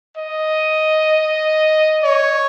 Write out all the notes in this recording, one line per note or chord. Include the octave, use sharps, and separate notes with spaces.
D#5
C#5